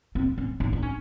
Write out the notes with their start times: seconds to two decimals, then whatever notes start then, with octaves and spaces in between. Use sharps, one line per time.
0.15 C4
0.38 C#4
0.60 D#4
0.73 D#4
0.82 C#4